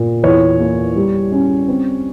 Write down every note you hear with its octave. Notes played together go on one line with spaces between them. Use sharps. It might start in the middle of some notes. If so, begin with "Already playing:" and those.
Already playing: A#2
E2 C#5
A#3
G3
C#4
C4